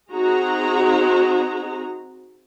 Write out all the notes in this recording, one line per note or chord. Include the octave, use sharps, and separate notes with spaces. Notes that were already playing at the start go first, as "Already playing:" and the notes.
C4 D#4 F#4 G#4 A#5